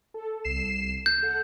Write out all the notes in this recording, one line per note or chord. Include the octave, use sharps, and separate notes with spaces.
A4
C2 C7 E7
G6
A4 F#5